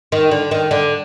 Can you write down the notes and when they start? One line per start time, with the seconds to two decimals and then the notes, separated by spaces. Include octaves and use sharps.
0.12 D#3
0.31 D3
0.51 D#3
0.71 D3